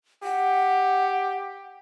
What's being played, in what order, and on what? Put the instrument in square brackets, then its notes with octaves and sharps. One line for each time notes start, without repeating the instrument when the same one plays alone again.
[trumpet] G4 [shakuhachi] F#5